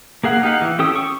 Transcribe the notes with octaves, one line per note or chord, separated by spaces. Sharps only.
A#3 G#4 F5 F#5
D#4 G4 F5 F#5
E3
C#4 G4 A4 G5 D#6
C#6